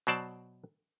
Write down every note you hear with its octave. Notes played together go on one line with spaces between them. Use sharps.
B2 F#3 C5 D5 A5